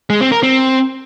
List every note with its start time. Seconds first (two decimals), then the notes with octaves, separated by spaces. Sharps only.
0.10 G#3
0.21 C4
0.32 A#4
0.43 C4